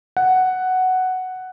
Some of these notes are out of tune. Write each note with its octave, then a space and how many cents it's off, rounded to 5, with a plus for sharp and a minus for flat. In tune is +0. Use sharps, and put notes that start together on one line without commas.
F#5 +5